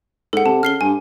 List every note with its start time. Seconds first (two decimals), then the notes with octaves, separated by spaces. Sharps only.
0.33 G#2 A4 F#5
0.46 C3 A5
0.63 C#3 F6 C7 G7
0.81 G2 G#5